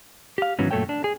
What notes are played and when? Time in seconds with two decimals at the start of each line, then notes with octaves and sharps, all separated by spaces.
0.38 G4 F5
0.59 G#2 D#3 E3 F#3 B3 C#4
0.71 F#2 A#2 A3 A4 C#5 G5
0.89 D4
1.04 G#4